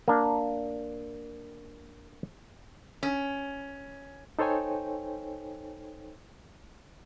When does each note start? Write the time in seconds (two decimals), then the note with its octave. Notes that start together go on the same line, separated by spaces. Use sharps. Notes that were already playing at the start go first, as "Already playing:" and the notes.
0.08 A#3 D4
3.03 C#4
4.39 D#4 A4 C5 C#5 G5 G#5